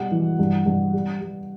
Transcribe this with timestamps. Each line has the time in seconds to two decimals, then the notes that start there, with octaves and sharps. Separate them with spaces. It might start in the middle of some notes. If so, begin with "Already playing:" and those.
Already playing: B2 G3 F#5
0.11 E3
0.39 G2
0.66 G2
0.93 G3
1.21 G3